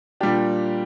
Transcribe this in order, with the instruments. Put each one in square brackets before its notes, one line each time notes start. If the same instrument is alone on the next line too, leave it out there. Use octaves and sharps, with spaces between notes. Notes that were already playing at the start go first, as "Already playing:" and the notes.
[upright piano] A#2 G3 D4 G4